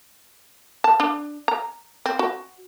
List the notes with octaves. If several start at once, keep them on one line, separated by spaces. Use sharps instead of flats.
A5
D4
A#5
C4
F#4